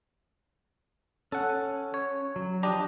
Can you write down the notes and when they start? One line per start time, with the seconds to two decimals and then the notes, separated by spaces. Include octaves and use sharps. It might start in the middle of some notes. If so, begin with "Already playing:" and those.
1.32 C#4 A4 F#5
1.94 C#5
2.36 F#3
2.63 F3 D4 G4 D#5 A#5